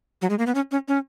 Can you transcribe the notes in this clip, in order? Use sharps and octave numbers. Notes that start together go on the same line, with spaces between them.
F#3
G#3
A#3
B3
C#4
C#4
C#4